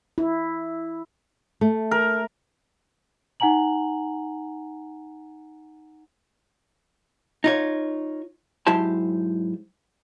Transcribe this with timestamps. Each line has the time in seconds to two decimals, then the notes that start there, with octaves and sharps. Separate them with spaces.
0.18 E4
1.61 A3
1.91 A#4
3.40 D#4 F#5 G#5 A#5 F#7
7.44 D#4 F4 C#5
8.67 G#2 F#3 E4 G4 C5 A5